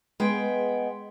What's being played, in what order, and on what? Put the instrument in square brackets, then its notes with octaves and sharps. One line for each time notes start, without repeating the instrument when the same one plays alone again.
[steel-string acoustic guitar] G#3 B3 G5